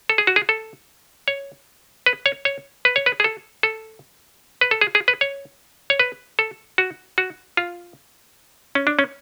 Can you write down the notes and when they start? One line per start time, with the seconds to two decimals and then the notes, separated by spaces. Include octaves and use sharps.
0.09 A4
0.18 G#4
0.27 F#4
0.36 G#4
0.49 A4
1.28 C#5
2.06 B4
2.26 C#5
2.45 C#5
2.85 B4
2.96 C#5
3.06 B4
3.20 G#4
3.24 A4
3.63 A4
4.61 B4
4.71 A4
4.81 G#4
4.95 G#4
5.08 B4
5.21 C#5
5.90 C#5
6.00 B4
6.39 A4
6.78 F#4
7.18 F#4
7.57 F4
8.75 C#4
8.87 D4
8.99 C#4